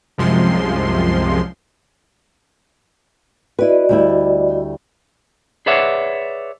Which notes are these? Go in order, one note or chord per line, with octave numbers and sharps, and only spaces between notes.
C2 F#2 C3 F3 G#3 C6
E4 F#4 B4 D5 D#5
D2 G3 E4
G#4 B4 C#5 D5 E5 F#5